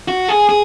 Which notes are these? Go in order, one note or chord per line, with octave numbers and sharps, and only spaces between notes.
F#4
G#4
G#4